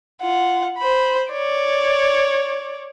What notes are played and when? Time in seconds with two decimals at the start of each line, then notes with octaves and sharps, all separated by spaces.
0.21 F4 F#5
0.79 C5 B5
1.31 C#5 D5